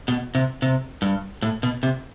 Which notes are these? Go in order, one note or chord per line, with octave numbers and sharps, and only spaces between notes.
B2
C3
C3
G2
A2
B2
C3